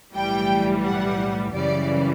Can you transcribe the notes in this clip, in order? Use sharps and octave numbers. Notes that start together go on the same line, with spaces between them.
B1 A2 E3 G3 G5
F#5
F#2 C#3 E3 G3 D5